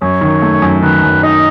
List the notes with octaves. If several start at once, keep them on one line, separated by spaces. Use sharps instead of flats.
F#2 C#5
D#3
A3
F#2
D#3 B4
F#2
D#4 D#5